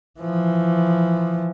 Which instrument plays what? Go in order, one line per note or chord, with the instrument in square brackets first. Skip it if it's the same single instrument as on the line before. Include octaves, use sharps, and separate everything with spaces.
[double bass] E3 F3